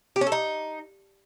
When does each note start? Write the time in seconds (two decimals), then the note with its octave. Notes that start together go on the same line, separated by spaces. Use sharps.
0.16 G4
0.21 C#4
0.27 A4
0.32 D#4